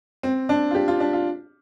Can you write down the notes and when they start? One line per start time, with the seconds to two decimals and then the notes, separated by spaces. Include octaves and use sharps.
0.23 C4
0.49 D4
0.71 F4
0.75 G4
0.88 F4
1.00 D4
1.13 F4